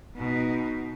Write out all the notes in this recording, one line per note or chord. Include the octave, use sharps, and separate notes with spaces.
B2 D#4